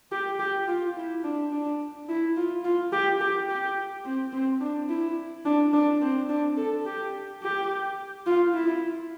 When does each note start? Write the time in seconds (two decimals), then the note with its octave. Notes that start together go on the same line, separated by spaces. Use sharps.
0.12 G4
0.39 G4
0.68 F4
0.96 E4
1.24 D4
1.52 D4
2.09 E4
2.36 F4
2.64 F4
2.92 G4
3.21 G4
3.49 G4
4.05 C4
4.32 C4
4.61 D4
4.89 E4
5.45 D4
5.73 D4
6.02 C4
6.29 D4
6.57 A4
6.86 G4
7.42 G4
8.26 F4
8.54 E4